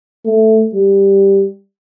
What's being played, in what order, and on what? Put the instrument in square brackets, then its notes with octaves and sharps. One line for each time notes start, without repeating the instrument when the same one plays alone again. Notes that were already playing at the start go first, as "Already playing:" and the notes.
[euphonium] A3
G3